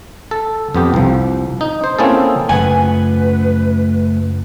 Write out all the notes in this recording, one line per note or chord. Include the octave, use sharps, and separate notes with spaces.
A4
F2 B3 G4
C2 F3
D#4
C5
A#3 C4 C#4 E4 G#4 A4
F#2 C#3 F3 A3 B4 F#5 G#5